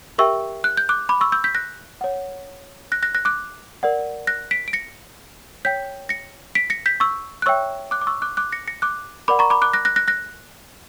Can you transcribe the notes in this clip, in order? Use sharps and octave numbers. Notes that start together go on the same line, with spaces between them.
G4 A#4 E5 G5 C#6 E6
F#6
G6
D6 F#6
B5 D6
C#6 E6
E6 G6
G6 B6
F#6 A#6
C#5 F#5
F#6 A#6
F#6 A#6
F#6 A#6
D6 F#6
A#4 D5 F#5
F#6 A#6
B6 D7
D7
A#6 C#7
C#5 G5 G6 B6
A#6 C#7
B6 D7
A#6 C#7
G6 B6
C#6 E6
F#6
C#5 E5 G5 C#6 E6
D6 F#6
D6
C#6 E6
D6 F#6
D6 F#6
A#6 C#7
A#6 C#7
D6 F#6
A#4 D5 F#5 B5 D6
A#5 C#6
B5 D6
D6 F#6
F#6 A#6
F#6 A#6
F#6 A#6
F#6 A#6